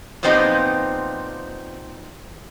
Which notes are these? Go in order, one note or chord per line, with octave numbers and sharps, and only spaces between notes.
A#2 F3 B3 C4 D#4 G4